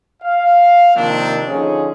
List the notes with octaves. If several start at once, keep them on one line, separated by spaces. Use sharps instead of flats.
F5
C3 D#3 F3 A#3 C4 D4
D3 F3 C#4 D#4 G#4